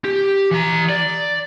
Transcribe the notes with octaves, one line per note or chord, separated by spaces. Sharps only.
G4
E3 A#5
D5